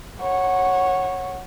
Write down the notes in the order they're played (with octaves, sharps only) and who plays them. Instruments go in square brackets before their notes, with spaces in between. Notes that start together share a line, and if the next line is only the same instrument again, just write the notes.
[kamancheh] C#5 F#5